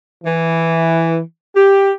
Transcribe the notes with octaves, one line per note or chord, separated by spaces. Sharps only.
E3
G4